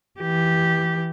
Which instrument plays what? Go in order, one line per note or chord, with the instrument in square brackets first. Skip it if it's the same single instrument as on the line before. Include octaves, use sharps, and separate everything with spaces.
[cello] E3 G4